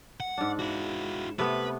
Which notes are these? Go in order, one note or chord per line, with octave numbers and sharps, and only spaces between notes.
F#5
G#2 D4
E4 F#4
C3 A3 B3 B4